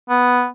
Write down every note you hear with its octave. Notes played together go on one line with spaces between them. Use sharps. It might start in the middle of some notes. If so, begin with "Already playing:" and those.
B3